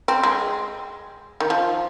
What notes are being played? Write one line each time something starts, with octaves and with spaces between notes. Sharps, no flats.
C4
G#3
D#3
F3